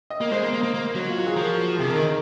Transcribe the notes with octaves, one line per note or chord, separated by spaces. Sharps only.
D#5
A#3
G#3 C5
A#3
A#3
A#3
A#3
F#3
F4
F#4
G#4
F3 A#4
C3 G#4
A#4
D#3
A#4